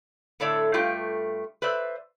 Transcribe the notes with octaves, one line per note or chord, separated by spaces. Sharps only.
A2 D3 A4 C#5 D5 E5
G2 A3 F4 G4 G5
B4 C5 D5 E5